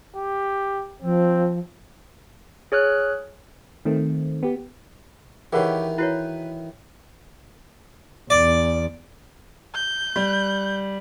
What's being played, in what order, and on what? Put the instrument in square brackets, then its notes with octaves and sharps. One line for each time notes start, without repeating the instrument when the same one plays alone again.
[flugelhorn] G4
[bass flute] F3 [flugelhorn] C4
[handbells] G#4 C#5 F6 F#6
[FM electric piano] D#3 A3 C4
B3 G4
[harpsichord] D#3 E3 [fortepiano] G4 B4 C#5 [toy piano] G#4 A#4 F#5
[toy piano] E4 F#4 C#5 [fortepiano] B4
[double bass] E2 [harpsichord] D5
[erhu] G6
[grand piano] G3